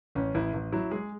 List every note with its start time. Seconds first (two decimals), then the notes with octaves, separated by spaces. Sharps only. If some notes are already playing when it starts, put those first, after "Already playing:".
0.15 A1 C#4
0.34 A1 E4
0.54 A1
0.72 F#3 E4
0.91 G#3 G#4